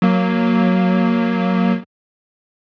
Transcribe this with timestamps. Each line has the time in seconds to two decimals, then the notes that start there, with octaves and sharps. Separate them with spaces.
0.02 F#3 A#3